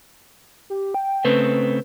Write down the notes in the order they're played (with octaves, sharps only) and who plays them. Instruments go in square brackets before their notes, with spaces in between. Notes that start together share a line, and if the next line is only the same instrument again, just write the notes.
[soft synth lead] G4
G5
[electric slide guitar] C#3 A3 C4 [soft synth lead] B4